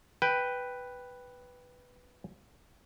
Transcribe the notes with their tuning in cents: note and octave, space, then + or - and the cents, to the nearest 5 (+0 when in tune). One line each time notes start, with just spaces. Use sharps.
B4 +0 G5 +0